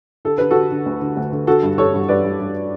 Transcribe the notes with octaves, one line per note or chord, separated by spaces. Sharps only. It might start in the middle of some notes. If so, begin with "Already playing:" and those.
D3 A4
D3 B4
D3 F#4 A4
D3
D2
D3
D2
D3
D3 F#4 A4
G2
G2 A4 C#5
G2
G2 B4 D5
G2
G2